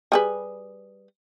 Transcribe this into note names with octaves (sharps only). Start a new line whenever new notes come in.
G3 G#4 B4